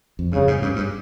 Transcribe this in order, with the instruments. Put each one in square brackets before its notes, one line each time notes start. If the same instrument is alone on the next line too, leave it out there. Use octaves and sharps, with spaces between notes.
[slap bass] F2
[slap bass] G2 [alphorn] C#3
[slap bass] G#2
G2
G2